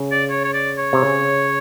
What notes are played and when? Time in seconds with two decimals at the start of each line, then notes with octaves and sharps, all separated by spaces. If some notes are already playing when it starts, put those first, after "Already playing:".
Already playing: C#3
0.12 D5
0.30 C#5
0.44 C#5
0.54 D5
0.78 C#5
0.93 C3
1.02 C#3